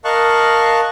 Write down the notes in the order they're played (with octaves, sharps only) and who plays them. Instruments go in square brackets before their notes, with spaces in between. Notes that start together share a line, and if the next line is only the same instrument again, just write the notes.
[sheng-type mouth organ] A#4 D#5 F5 A5 C#6 F#6